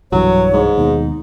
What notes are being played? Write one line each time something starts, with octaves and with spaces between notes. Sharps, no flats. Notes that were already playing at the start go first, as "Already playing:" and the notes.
B1 G2 E3 F#3 C#5
G#2
D#2 B2 D#4